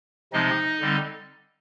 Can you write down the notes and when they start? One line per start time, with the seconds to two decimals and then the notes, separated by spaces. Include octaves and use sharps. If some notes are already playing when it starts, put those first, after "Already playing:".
0.33 C3 F3 G#3 C4 D#4 D#5
0.80 D3 G3 C4